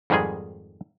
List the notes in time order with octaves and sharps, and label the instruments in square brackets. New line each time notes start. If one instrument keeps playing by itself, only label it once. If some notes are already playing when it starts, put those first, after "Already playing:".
[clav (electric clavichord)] F2 G#2 D#3 G3 G#3 G#4